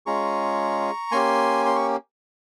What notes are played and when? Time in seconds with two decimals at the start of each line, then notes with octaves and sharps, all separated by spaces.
0.06 G#3 C#4 F4 G#4 A#5 C#6
1.12 A#3 C#4 G4 G#5 C6
1.66 C6
1.76 C#6